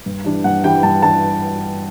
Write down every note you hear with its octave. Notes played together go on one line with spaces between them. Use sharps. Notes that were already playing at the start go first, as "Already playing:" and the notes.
G2
E3 G3 D4
G2 F#5
E3 G3 D4 G5
G2 A5
E3 G3 D4 A5